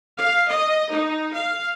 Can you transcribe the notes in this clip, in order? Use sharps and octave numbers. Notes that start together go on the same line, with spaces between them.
F5
D#5
D#4
F5